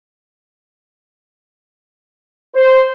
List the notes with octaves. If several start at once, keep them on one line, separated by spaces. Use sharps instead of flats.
C5